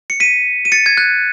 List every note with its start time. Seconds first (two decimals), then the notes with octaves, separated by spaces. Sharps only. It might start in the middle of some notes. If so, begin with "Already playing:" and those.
0.10 C#7
0.20 B6 D#7
0.65 D#7
0.72 A6 C#7
0.86 G#6
0.97 F#6